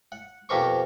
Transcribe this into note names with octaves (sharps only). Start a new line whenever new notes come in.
F#5
F2 B2 G4 A#4 C5 C#6